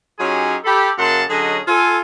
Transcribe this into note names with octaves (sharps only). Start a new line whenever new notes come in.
F#3 C#4 D#4 F4 G4 G#4
G4 A4 B5
F#2 C#3 A#3 F#5 A5 C6
D3 F#3 C#4 G#4 D#5
F4 A4 G#5